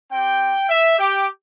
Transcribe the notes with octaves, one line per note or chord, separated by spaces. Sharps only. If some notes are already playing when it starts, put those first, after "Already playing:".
C4 G4 G5
E5
G4